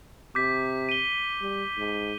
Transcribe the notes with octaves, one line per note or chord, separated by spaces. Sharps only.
C3 D6 G6 B6
D#7 G7
G3
G#2